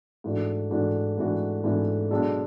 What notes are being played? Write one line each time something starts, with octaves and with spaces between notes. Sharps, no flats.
G#2 E3 A3 D4 F#4
G#2 E3 A3 D4 F#4
G#2 E3 A3 D4 F#4
G#2 E3 A3 D4 F#4
B1 B2 G#3 D4 A4